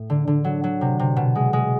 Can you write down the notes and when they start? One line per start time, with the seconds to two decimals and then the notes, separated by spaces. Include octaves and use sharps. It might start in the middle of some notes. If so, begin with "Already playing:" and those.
Already playing: A2
0.10 D3
0.27 D3
0.44 F#3
0.64 F#3
0.81 C3
0.99 C3
1.17 B2
1.35 G#3
1.53 G#3